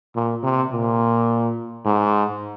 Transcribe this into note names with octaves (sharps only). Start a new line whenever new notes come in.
A#2
C3
A#2
G#2